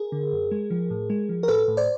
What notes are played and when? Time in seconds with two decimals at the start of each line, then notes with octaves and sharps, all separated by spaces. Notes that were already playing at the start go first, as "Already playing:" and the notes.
Already playing: G#4 A#4
0.12 D3
0.32 F#2
0.51 G#3
0.70 F3
0.90 A2
1.10 G#3
1.29 F3
1.43 A#4
1.48 A2 A4 B4
1.68 A2
1.77 C5 D5